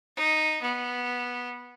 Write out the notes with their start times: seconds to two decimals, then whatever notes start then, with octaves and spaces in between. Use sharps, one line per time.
0.16 D#4
0.62 B3